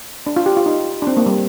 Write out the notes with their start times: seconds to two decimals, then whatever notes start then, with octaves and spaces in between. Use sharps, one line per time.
0.27 D4
0.36 F4
0.46 G4
0.57 F4
0.66 D#4
1.02 D4
1.07 C4
1.17 A#3
1.26 G3